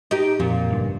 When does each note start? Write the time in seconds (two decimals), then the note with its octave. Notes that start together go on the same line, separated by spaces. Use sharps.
0.11 D#4 G4
0.40 F2 A#2
0.70 F#1 G2